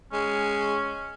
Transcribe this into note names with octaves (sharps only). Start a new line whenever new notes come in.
G#3 C#4